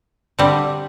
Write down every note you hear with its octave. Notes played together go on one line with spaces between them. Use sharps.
D3 G3 C4